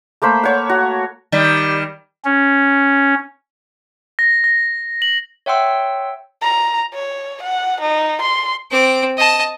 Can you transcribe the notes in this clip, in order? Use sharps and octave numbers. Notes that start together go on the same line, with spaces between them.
A3 A#3 C5 B5
C#5 F#5
F#4
D#3 G3
C#4
A#6
A#6
F#7
C#5 E5 F#5 G5 C6 E6
A#5
C#5
F#5
D#4
C6
C4 D6
D#5 A5